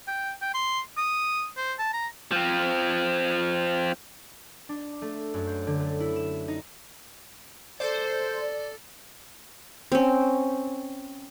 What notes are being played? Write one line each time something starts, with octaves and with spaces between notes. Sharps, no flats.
G5
G5
C6
D#6
C5
A5
A#5
F3 C4
D4
A3
F#2
C5
D3
A3
E4
E7
D#4
A4 C5 D5
C4 C#4